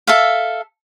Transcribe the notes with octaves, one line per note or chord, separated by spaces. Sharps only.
A4 E5 F5